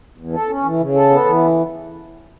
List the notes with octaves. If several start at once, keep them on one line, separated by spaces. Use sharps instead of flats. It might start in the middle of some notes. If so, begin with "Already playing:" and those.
E2
A4
C#4
E3
C#3
A4
B3
E3